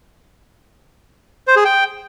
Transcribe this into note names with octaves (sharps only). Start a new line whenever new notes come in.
C5
G#4
G5